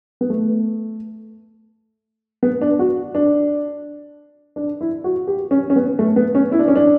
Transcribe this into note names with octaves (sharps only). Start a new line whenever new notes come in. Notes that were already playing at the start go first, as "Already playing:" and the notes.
B3
A3
B3
D4
F#4
D4
D4
E4
F#4
G4
C#4
C#4
B3
A3
B3
C#4
E4
D4
C#4
D4